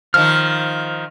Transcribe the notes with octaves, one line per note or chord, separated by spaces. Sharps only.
D#3 F3 F6